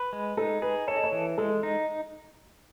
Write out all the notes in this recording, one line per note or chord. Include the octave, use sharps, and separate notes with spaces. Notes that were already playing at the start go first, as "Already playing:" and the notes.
Already playing: B4
G#3
D#4 A4
G#4 B4
A4 C#5
D#5
C#5
E3
G#3 A4
D#4